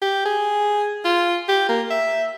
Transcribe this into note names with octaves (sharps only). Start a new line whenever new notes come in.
G4
G#4
F4
G4
A#3
E5